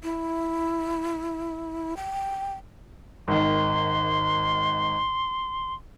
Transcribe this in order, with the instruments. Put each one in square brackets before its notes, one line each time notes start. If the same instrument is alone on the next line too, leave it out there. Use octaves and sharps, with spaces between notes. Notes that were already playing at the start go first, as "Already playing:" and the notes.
[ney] E4
G5
[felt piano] G#1 D#3 [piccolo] C6